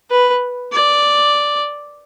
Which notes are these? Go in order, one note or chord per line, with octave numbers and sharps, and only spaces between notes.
B4
D5